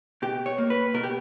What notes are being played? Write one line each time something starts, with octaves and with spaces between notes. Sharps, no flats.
B2 G4
C#5
A#3
B4
B2 A#4
G4